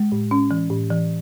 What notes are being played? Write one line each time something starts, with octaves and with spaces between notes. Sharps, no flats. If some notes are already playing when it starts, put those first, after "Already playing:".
Already playing: G#3
A2
C#4
E3
A2
E3